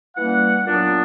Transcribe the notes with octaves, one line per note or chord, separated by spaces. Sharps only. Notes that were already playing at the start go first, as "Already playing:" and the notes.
E3 G3 A#3 C#4 F#5
A#2 F#3 B3 D4